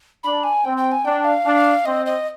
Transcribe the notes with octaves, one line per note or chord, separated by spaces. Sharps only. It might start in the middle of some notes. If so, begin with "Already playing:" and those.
D4 B5
G#5
C4 G5
G5
G#5
D4 G5
F5
D4
C4 D#5
D#5